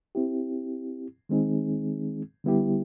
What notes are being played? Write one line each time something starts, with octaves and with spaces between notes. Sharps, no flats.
C4 E4 G4
D#3 G#3 C4 D#4 G#4
D3 G3 B3 E4 G4